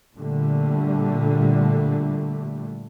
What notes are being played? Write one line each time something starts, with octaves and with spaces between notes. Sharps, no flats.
A#2 D3 G3 A3